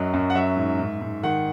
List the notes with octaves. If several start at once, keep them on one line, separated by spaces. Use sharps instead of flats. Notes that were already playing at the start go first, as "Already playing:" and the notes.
Already playing: F#2 F#3 D#5
F#2
F#5
F#3 E5
G#2
G#2
G#2
D#3 F#5